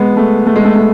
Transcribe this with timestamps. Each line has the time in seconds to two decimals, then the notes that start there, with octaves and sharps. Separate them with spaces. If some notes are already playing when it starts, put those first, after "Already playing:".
Already playing: G#3 B3
0.17 A3
0.47 A3
0.56 G#3
0.65 A3
0.75 A3